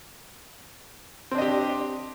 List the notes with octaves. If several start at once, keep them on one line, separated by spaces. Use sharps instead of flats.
C4 D4 G4 D#5